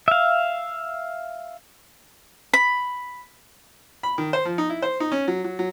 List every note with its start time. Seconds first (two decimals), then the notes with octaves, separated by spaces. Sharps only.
0.08 E5 F5
2.53 B5
4.03 B5
4.18 D#3
4.33 C5
4.45 F3
4.58 D#4
4.70 E4
4.82 C5
5.00 D#4
5.12 C#4
5.28 F#3
5.44 F#3
5.59 F#3